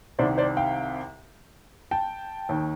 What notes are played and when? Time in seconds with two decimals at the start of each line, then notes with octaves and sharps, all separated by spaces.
0.18 C2 C3 D#3 C5 D5
0.38 C5 D5
0.57 F5 G5
1.91 G5 A5
2.49 D#2 D#3